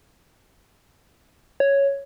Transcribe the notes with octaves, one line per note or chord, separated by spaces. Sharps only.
C#5